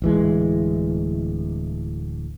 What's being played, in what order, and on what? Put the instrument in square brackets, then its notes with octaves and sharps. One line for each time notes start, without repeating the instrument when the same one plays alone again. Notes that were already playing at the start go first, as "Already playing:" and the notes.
[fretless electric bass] D1 E3 G#3